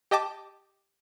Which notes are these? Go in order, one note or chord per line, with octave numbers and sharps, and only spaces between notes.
G4 D#5 G5 A5 D6